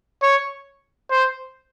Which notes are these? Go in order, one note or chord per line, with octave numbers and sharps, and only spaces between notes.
C#5
C5